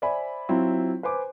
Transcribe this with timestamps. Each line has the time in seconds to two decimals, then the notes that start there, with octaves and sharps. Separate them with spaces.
0.02 C5 D5 E5 G#5 B5
0.49 F#3 C4 E4 F4
1.03 B4 C5 G#5 D6